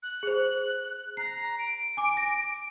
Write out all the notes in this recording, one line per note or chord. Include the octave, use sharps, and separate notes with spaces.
F#6
G#4 C5
A#5 C7
D7
G#5 D6
A#6